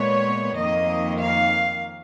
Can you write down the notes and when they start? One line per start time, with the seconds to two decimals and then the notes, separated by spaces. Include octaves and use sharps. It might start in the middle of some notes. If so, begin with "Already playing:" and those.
Already playing: A#2 G#3 B3 C#5
0.56 F2 D#3 A#3 D#5
1.19 F5